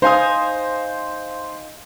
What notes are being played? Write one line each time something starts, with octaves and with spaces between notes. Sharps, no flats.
D#4 C5 F5 G#5 D#6